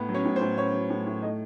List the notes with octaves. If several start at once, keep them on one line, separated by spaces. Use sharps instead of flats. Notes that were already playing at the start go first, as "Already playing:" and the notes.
Already playing: A2 B3
F#3
C#4 C#5
A2
C5
A2
B3 C#4 C#5
F#3
A2
A2
A3 D#4 D#5